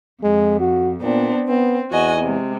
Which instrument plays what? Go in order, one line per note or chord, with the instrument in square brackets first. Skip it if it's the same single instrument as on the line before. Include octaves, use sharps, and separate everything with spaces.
[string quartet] F2 [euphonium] G#3
[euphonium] F#4
[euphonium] A#2 [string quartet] B3 C4 D4
[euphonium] B3 [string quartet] C4
[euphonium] E2 [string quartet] F#4 D#5 G#5
[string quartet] C3 G#3